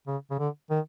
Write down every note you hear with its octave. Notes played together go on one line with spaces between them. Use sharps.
C#3
C#3
D3
D#3